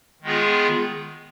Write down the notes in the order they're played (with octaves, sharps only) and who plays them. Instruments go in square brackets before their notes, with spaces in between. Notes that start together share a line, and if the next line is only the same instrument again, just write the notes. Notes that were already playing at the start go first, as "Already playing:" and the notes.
[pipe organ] D#3 G#3 B3 F4 G#4